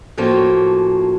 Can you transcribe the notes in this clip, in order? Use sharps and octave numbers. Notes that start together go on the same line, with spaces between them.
A2 F3 F#3 A#3 C#4